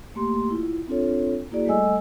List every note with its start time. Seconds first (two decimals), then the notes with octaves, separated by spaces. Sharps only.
0.15 A3 A#3 G4 C6
0.50 E4 F4
0.88 C4 D4 F4 A4 C#5
1.51 A#3 E4 F#4 G#4 D5
1.66 G3 A3 A4 D#5 G#5 E6